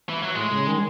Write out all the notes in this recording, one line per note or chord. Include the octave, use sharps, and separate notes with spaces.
E3
F#3
A2 G#3
C#3
D#3